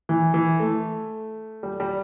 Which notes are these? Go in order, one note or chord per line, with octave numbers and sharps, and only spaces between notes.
E3
E3
A3
G3
G3